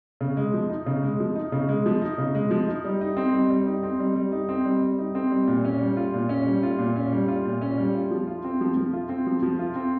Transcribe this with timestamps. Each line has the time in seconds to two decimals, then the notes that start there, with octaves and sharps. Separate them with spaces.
0.21 C#3
0.37 G#3
0.54 F3
0.69 D#4
0.86 C#3
1.03 G#3
1.20 F3
1.35 D#4
1.52 C#3
1.68 G#3
1.86 F3
2.02 D#4
2.18 C#3
2.35 G#3
2.51 F3
2.68 D#4
2.84 G3
3.01 D#4
3.17 C4
3.33 G3
3.50 G3
3.66 D#4
3.83 C4
3.99 G3
4.15 G3
4.32 D#4
4.49 C4
4.65 G3
4.82 G3
4.98 D#4
5.15 C4
5.31 G3
5.47 A#2
5.65 C#4
5.80 G3
5.97 F4
6.14 A#2
6.29 C#4
6.46 G3
6.63 F4
6.79 A#2
6.96 C#4
7.12 G3
7.28 F4
7.45 A#2
7.61 C#4
7.78 G3
7.94 F4
8.11 F3
8.27 F4
8.44 C4
8.61 F3
8.77 F3
8.93 F4
9.09 C4
9.27 F3
9.42 F3
9.59 F4
9.76 C4